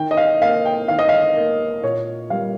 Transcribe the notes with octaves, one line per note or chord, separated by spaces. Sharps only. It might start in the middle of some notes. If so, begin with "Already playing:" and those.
Already playing: D#3 G5
D#5
F5
A#3 F5
G5
D#3 F5
D#5
F5
A#3
A#2 C#5
G3 A#3 F5